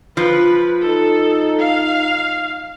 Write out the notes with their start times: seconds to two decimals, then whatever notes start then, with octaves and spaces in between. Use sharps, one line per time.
0.17 F3 B4
0.85 D#4 A4
1.60 F5